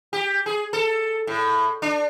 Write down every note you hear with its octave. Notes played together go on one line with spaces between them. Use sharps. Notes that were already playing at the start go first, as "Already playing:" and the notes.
G4
G#4
A4
A2
D4